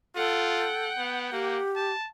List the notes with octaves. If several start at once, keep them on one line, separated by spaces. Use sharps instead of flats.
F4 A4 F#5 G5
B3
A#3 G4
A5